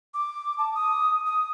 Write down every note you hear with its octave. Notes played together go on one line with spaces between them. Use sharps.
D6
A5
D#6
D#6